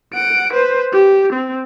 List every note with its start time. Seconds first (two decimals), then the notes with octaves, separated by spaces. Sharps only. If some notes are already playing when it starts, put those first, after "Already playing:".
0.14 F#5 D7
0.52 B4 C5
0.92 G4
1.33 C4